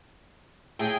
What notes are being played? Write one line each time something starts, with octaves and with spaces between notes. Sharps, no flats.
A2 G#4 G5